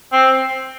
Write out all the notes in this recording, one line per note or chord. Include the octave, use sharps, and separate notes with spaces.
C4